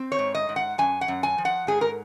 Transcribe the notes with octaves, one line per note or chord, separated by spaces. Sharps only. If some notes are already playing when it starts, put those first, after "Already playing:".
Already playing: C4
C#5
G#2
D#5
G#2
F#5
F#2 G#5
F#5
F#2
G#5
F3
F#5
G#2 G#4
A#4